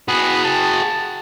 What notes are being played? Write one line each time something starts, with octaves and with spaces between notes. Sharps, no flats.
B3 F#4 G#4
A5